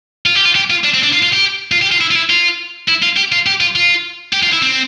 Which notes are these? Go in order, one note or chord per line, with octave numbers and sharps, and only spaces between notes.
F4
G4
F4
G4
F4
D4
C4
D4
F4
F4
G4
F4
G4
F4
E4
F4
E4
F4
E4
F4
G4
F4
G4
F4
F4
G4
F4
E4
C4